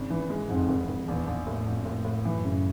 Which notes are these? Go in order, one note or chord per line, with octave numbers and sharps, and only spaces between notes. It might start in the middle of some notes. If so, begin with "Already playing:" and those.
Already playing: G#1 C#3
E3
G#3
F2 G#2
G#1
G#1
A#1 E2
A#1
A2
A#1 F2
A2
A2
F#2 E3
C#3